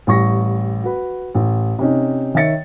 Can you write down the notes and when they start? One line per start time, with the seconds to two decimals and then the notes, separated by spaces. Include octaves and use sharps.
0.07 A1 G3 C#6 A#6
0.84 F#4 B4
1.35 A1
1.79 C3 C#4 D#4
2.35 D#3 C#5 E5 A6 C#7